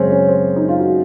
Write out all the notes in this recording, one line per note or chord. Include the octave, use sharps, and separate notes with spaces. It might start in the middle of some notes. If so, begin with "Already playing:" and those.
Already playing: F#2 C#3 G#3 C4 C#4
C#4
C4
D#4
F4
F#4